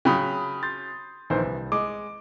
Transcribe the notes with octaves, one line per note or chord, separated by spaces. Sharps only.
C#3 F#3 G5 B5 D#6
C6 G6 A6
A#1 D#3 E3 C5
C2
G#3 D6